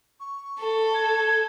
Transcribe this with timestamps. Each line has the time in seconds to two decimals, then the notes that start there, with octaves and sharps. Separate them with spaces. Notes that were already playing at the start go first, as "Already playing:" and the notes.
0.20 C#6
0.60 A4
0.95 G#6